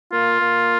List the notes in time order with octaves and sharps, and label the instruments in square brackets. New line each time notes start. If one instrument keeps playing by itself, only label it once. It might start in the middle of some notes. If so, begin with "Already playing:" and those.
[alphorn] A#3 [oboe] F4
[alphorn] A#3